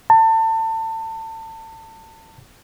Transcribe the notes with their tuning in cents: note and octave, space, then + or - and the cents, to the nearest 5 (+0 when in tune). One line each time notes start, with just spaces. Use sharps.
A5 +30